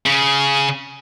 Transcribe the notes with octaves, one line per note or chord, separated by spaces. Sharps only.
C#3